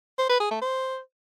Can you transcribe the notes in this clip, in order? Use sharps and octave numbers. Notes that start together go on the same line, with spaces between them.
C5
B4
G#4
A3
C5